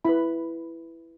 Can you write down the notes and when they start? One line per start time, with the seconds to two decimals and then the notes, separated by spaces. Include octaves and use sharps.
0.05 E4 B4 B5